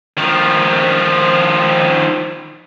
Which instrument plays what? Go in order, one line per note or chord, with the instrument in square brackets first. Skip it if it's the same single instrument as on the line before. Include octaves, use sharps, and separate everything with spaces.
[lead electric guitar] D#3 F3